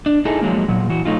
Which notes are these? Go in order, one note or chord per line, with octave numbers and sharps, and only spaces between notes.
D4
D#4 E4 G#4 A4
F3 F#3 G#3 A#3
A#2 F#3
E3 F#4
F#3 A3 D#4 F4